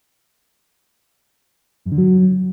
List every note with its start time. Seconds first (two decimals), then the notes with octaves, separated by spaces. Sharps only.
1.86 F#2
1.92 D3
1.98 F#3